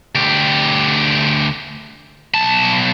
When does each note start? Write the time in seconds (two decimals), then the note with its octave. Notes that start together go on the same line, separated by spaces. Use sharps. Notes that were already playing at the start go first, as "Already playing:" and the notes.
0.15 D2 G4
2.34 B1 A5